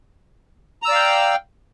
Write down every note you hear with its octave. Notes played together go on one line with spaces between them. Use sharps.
D5 F5 G5 A#5 E6